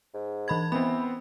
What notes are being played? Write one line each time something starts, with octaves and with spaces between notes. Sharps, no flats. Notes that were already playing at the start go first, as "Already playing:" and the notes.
G#2
E3 B5 G#6
E3 B3 C4 B5